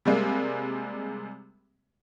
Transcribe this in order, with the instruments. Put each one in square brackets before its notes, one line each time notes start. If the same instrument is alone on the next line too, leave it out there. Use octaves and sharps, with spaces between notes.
[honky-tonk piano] C3 G3 G#3 A#3